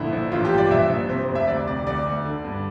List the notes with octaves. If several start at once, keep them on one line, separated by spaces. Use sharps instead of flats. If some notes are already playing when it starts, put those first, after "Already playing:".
Already playing: A#1 D3 E4
A#1
A1 F4
G4
G2
D5
A#1 E5
A#1
C3 C5
F1
E5
D2 D5
C3 D5
D2 D5
D2
D3
G2